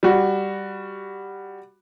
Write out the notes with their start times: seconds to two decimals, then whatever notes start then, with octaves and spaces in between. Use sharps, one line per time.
0.03 G3 F#4